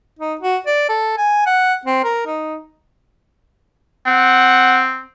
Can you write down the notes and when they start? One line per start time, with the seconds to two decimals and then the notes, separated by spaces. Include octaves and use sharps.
0.19 D#4
0.41 F#4
0.67 D5
0.89 A4
1.18 G#5
1.47 F#5
1.86 C4
2.04 A#4
2.27 D#4
4.06 C4 F#5